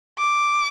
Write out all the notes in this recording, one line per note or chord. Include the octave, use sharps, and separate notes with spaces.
D6